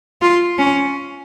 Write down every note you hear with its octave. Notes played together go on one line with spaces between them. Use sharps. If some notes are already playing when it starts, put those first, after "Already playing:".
F4
C#4